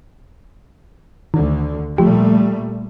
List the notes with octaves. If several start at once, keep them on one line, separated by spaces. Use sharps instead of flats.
D2 D3 D#3
A#2 F3 G3 A3 G4